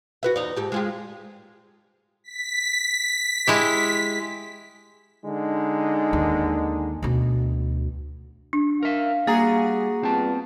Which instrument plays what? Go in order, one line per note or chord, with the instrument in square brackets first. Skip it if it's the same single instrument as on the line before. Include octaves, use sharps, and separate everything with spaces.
[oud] F#4 B4 E5
E2 D#4 D5
G#2 G4 A4
G#3 F4 G4
[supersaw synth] B6
[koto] G#3 E4 G4
[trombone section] D3 G#3 D#4
[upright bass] D#2
D2 B2
[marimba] D4
[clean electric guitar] A#4 E5 [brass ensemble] F5
[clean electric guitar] G3 A#5 [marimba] A#3 [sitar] F#4 G#4
[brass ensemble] G3 B3 F4 [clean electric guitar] C4 A5